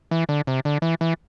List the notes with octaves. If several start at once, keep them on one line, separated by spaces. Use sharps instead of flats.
E3
D3
C3
D3
E3
E3